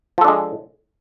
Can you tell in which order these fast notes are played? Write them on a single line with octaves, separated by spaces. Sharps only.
F3 A4 D4 G#3